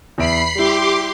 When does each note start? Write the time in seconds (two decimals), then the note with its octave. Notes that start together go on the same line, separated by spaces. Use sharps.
0.18 E2 E5 B5 C7 D7
0.55 G3 E4 G4 C6 D6